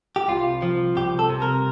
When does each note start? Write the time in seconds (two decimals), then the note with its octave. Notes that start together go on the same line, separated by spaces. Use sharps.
0.16 G4
0.28 C2 F4
0.62 F3
0.96 C2 G4
1.19 A4
1.30 C3
1.42 A#4